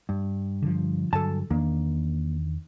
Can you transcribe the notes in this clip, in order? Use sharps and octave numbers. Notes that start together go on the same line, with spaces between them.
G2
D3 F3
G2 D3 F#3 A4 G#5 A5
E2 D#3 A#3 D4